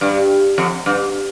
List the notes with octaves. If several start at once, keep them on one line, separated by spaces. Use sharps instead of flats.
G2
F2
G2